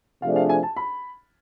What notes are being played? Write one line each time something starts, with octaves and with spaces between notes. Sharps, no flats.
C3 F3 A3 D4 G#4 F5
F5
G#5
A5
B5